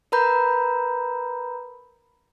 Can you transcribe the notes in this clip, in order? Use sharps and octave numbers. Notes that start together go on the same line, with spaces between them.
A#4 B4 A#5 B5 G6